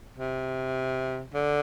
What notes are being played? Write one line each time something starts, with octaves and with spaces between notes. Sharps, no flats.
C3
D3